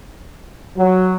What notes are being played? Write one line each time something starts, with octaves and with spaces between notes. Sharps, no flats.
F#3